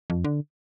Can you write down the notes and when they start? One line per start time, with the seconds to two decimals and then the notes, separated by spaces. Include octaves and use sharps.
0.10 F2
0.25 D3